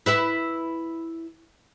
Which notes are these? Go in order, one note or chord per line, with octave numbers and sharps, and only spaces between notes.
E4 B4 E5